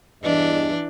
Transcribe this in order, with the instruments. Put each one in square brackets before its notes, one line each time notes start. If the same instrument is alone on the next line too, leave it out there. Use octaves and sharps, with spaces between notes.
[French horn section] E2 G2 D#5 [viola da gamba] E3 D4